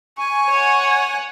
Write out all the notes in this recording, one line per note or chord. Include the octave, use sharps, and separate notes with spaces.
G#5 C#6
C#5 F#5